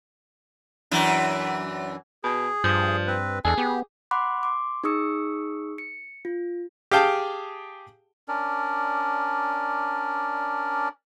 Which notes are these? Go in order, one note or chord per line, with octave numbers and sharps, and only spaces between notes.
F#2 E3 D4
B2 G#4
G2 F3
C4 B4
E2 D4 G#4 A4
B3 G4
F#5 B5 C6 D6 F#6
C6 D6
D#4 G#4 C#6 D#6 E6 C#7
C#7
F4
G4 G#4 F5 G5 A5
C#4 D4 A#4 D5